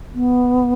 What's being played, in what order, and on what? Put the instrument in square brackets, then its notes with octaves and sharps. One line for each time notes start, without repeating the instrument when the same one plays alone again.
[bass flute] B3